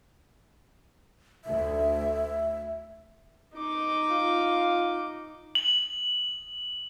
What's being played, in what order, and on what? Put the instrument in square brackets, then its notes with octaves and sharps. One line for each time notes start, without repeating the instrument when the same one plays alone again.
[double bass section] D2 [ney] E5
[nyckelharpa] D#4 D6
[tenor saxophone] F4
[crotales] F#7